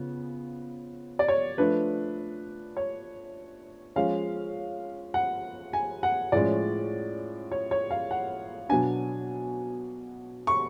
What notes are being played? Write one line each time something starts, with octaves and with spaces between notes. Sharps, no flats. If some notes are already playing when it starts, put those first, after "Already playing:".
Already playing: C#3 F3 B3
D5
C#5
F3 A3 D4 B4
C#5
F3 G#3 C#4 F5
F#5
G#5
F#5
A2 F3 G#3 C#4 D5
C#5
C#5
F5
F#5
B2 F#3 B3 D4 G#5
C#6